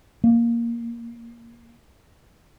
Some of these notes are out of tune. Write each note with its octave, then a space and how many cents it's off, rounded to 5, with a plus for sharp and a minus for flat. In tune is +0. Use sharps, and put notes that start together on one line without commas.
A#3 +5